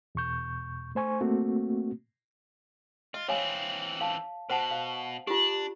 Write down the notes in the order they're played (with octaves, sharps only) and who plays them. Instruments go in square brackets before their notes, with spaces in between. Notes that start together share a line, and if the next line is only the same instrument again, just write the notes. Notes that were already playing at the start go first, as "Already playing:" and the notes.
[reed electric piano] E2 B2 C#6 G6
A3 C5 G#5 C#6
A3 A#3 C4 F#4
[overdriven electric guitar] F4 [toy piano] D#5
[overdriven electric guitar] E3 C4 [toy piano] C#5 F5 G#5
[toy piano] F5 A5
[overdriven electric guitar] B2 [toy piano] C5 F#5 A5
[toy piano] F5
[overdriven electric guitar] D4 [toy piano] F4 G4